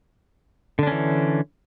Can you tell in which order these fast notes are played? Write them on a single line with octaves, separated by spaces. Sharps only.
D3 D4 C#4 E3